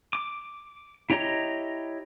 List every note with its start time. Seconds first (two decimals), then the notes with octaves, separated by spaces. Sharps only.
0.13 D6
1.10 E4 G4 C#5 D#5 A#5